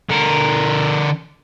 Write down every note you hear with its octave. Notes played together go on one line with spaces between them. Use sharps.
D3 A#4